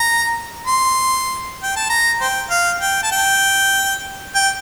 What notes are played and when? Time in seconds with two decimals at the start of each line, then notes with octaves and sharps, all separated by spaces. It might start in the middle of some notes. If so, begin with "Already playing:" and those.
Already playing: A#5
0.67 C6
1.63 G5
1.76 A5
1.90 A#5
2.21 C5 G5
2.50 F5
2.81 G5
3.03 A5
3.11 G5
4.35 G5